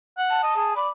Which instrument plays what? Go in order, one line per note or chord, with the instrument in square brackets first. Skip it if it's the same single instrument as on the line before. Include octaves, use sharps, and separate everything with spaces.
[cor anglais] F#5
[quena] A5
[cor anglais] D#5
G#4
[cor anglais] D5 [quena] B5